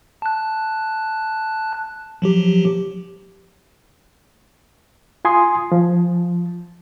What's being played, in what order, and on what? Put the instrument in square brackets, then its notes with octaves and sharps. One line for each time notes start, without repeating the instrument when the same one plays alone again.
[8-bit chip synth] A5 F#6
F3 F#3 G4
[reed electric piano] F4 G#5 C6 D#6
F3